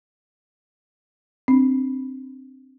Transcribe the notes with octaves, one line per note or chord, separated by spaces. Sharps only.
C4 D4